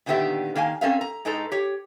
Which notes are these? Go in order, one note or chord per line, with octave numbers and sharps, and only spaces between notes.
A#2 D3 D#3 B3 G4 E5
D#3 A#3 F5 G#5
C4 C#4 A4 A#4 E5 F5
A#5
A2 G#3 D#4 A4 B4 A#5
G4 C#5